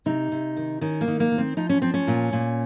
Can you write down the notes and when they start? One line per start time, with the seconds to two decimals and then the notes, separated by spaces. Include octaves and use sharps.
0.06 C3 D#4
0.32 C3
0.57 D#3
0.81 D#3 C#4
1.01 A#3
1.08 D#3
1.20 A#3
1.32 D#3
1.38 C4
1.57 F3 D#4
1.69 C#4
1.82 F3 C4
1.94 C#4
2.07 A#2
2.33 A#2